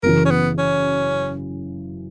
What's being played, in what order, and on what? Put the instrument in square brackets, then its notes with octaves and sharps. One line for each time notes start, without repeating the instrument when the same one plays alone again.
[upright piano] F#1 F#2 C#3 E3 [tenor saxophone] A#4
[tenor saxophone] C#4
B3
C#4